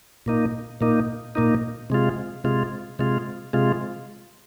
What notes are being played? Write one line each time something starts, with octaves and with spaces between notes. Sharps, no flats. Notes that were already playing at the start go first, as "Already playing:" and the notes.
A#2 A#3 D#4
A#2 A#3 D#4
A#2 A#3 D#4
C3 G#3 F4
C3 G#3 F4
C3 G#3 F4
C3 G#3 F4